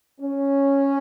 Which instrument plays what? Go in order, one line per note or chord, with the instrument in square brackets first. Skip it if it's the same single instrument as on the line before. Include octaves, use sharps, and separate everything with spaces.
[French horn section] C#4